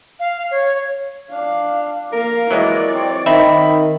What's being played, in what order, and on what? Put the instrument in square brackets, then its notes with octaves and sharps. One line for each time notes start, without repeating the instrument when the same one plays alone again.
[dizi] F5
C#5
[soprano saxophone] D4 [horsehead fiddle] F5
[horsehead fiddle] A#3 F5 [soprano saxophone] A#4
[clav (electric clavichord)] E3 F#3 G#3 [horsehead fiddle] C#5 D5
[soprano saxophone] C4
[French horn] D#3 [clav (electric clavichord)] C4 D#4 E5 [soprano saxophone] B5